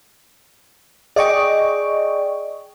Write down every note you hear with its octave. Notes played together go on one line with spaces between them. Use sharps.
G#4 D5 D#5 G5 C#6